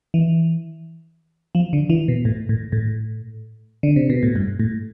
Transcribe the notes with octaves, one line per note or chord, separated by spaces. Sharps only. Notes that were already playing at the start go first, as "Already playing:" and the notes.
E3
F3
D3
E3
B2
A2
A2
A2
D3
C3
B2
A2
G2
A2